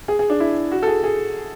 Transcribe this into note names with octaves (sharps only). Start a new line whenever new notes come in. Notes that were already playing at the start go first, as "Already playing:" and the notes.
G#4
G#4
D4
E4
F#4
A4
G#4
G#4